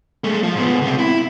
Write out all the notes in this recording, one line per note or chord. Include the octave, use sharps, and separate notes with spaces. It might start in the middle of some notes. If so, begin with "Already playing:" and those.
G#3 A3
F3
G#2 B3
C#2 C3
E4